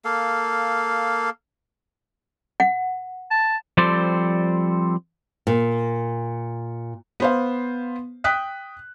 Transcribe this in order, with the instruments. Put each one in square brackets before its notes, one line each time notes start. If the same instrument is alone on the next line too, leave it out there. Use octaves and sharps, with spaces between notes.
[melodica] A#3 A4 F5
[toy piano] F#5
[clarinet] A5
[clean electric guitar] F3 G3 C4 A4 C5 D5
[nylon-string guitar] A#2
[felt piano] B3 C5 F5
G5 D#6 F#6 B6